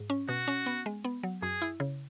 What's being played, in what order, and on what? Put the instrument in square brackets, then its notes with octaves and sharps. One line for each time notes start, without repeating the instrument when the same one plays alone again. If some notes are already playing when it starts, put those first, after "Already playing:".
Already playing: [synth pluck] G#2
C#4
[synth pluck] B2 [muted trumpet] F#4
[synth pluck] C#4
B3
G#3
B3
F#3
[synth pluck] F#2 [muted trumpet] G#4
[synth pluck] E4
C#3